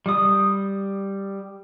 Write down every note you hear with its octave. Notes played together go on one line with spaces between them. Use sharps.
G3 D#6